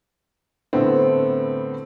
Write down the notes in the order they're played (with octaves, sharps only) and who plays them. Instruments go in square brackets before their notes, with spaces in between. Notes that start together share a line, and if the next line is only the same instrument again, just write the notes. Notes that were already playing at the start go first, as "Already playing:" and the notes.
[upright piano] A2 D3 A3 B3 C4